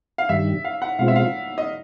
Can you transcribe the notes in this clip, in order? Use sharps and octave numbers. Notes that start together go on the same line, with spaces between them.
F5
G2 D#3 G3 E5
F5
F#5
B2 G#3 C4 F4 F5
E5
F5
D#5